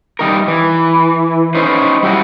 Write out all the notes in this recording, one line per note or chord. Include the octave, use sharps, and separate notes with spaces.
G3 D#4 A#4
E3
C#4 D#4 B4 C5
G3 E4 F#4